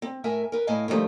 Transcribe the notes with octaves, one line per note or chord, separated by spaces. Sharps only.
C4
A2 A#4 E5 G#5
A#4 B4
A2 E4 D#5 F5 G#5
A2 D3 D#3 F3 G3 A3